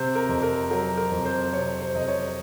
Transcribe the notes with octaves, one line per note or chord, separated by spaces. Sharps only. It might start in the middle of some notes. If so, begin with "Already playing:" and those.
Already playing: C3 C5
A#4
F2
A#4
F#3 A#4
A#4
F2
C5
C3 C#5
C5
F2 D#5
C#5